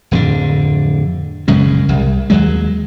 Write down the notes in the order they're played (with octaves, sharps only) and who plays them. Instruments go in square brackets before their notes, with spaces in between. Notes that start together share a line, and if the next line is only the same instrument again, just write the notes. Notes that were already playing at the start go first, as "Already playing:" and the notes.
[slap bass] D1 F2 D3
A#1 F#2 C#3 G#3
C2
D#2 F#3 G#3